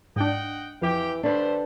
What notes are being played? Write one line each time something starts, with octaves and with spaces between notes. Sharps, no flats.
G#2 D4 D#5 F#5 G5
F2 E3 G4 F5 G5
D3 G3 A3 D4 B4 C5